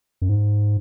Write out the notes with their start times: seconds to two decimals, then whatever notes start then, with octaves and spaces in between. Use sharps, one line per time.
0.22 F#2
0.29 G#2